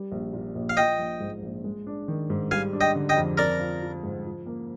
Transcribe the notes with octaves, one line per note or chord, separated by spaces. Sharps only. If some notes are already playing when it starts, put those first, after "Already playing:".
Already playing: G3
A#1
A#2
A#1
F5
F3 D#5 G5
A#1
G#2
A#1
G#3
D4
D#3
G#2
G3 F5 G#5
D4
D#5 G5
D3
D#5 G5
F2
C4 A#4 D5
F4
F3
G#2
F3
A#3